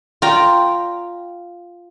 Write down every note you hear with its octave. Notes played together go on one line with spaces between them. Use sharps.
F4 D5 G5 A#5